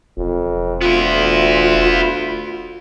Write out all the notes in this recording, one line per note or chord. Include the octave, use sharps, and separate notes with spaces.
E1 F2
D2 B3 E4 F4